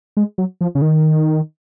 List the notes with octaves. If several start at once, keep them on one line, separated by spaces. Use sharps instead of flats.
G#3
F#3
F3
C#3
D#3